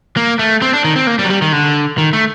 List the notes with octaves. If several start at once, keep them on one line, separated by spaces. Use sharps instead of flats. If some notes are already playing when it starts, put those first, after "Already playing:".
A#3
A3
C4
D4
D#3
C4
A#3
G3
F#3
G3
D#3
D3
D#3
A3